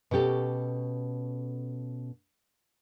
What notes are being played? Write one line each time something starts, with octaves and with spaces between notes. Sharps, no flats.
B2 C#4 G4 A4